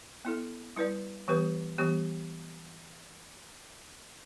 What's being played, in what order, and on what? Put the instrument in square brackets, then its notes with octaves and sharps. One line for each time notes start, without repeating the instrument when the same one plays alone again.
[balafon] B3 E4 A4
G3 E4 B4 D5
E3 G3 B3 G4 B4
E3 G3 B3 G4